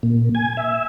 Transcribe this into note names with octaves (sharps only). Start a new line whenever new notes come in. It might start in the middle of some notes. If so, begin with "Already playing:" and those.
A#2
G#5
E5